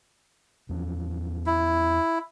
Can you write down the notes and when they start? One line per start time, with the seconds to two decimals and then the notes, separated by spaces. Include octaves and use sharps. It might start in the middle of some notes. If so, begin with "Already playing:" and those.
0.69 E2 F3 C#4
1.46 E4